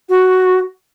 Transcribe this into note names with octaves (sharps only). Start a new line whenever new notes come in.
F#4